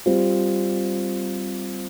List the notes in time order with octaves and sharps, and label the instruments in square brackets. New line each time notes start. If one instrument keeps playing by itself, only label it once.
[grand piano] G3 C4 F4 C5